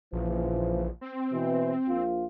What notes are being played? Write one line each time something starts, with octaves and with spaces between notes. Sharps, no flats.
A#1 C#3 E3 F3
C4
B2 E3
A#1 F4